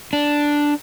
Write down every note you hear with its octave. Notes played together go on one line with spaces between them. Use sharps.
D4